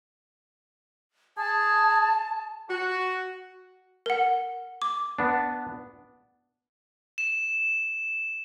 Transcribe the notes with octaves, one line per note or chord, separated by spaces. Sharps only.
G#4 A5
F#4
A#4 F#5
D6
B3 D4
E7